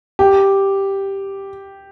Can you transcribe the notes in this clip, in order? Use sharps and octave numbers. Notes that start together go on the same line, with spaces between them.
G4